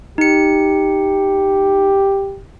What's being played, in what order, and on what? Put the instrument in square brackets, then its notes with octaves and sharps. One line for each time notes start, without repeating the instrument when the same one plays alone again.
[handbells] D#4 C#7 [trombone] G4